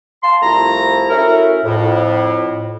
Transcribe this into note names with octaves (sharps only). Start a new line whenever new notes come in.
F5 A5 C6
C2 F3 A3 E4 A#5
A3 C#4 E4 F#4 A#4
F2 A2